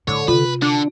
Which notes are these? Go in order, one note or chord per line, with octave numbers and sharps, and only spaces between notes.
A2 D3 C#5
C3 F4 B4
D3 D4